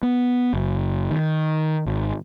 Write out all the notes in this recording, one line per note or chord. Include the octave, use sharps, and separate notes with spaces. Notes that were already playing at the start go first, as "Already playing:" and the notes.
B3
F#1
D#3
G#1